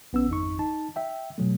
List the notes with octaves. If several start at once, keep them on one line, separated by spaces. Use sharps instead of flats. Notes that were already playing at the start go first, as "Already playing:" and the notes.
A#1 B3 C#4 E6
G#1 F2 D#4 C#6
D#4 A5
E5 G5
B2 F#3 A3